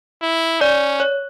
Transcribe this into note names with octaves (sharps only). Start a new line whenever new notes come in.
E4
C#4 D5
C#5